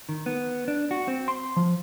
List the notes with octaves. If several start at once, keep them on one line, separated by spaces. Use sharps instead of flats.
D#3
B3
D4
F#4
C4
C6
F3